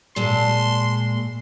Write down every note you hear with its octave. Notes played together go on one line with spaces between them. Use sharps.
A#2 G#3 A5 C6